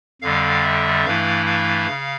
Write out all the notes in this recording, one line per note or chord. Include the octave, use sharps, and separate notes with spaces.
F2 D3 G3 F5
E5
G2 E3 A3 E4 F5
F5
C#3